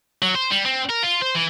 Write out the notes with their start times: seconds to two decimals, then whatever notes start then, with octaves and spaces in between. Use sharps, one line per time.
0.22 F#3
0.35 C5
0.51 G3
0.66 C4
0.90 A#4
1.03 F4
1.22 C5
1.35 E3